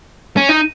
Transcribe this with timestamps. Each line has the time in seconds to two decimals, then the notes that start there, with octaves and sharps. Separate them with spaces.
0.37 C#4
0.49 D#4